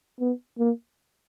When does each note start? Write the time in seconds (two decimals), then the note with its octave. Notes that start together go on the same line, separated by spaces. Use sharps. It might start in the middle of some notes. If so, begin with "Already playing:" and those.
0.20 B3
0.59 A#3